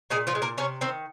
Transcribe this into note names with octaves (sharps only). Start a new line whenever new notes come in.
A#2 G#3 G#4
F3 F4
G#3
A#3 A#4
C3 C#4 C#5
D#3 C4 C5